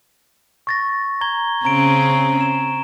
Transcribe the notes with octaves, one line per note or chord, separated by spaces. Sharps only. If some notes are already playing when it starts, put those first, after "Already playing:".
C#6 A6 A#6
A#5 G#6 G7
C#3 C4 C#4 A#5 D7
E7